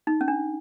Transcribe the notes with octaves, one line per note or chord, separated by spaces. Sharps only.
D#4
C#4
D4